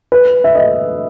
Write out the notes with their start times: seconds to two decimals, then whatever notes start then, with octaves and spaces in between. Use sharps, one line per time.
0.12 B4
0.44 E5
0.55 D#5